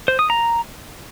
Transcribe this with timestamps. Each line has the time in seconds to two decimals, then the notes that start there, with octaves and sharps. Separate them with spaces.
0.08 C5
0.19 D#6
0.30 A#5